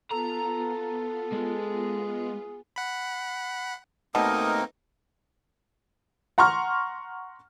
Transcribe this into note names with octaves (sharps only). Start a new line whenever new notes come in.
B3 F4 A4 A#5
G#3 G#4
F#5 B5
B2 A3 A#3 C4 D#4 A#4 D#6
F#5 A#5 C6 C#6 F6